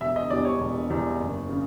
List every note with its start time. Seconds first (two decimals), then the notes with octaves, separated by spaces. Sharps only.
0.01 E1 E5
0.16 D#5
0.30 E2 B2 G3 D5
0.45 C#5
0.60 E1
0.90 E2 B2 G3
1.20 F#1
1.49 C#3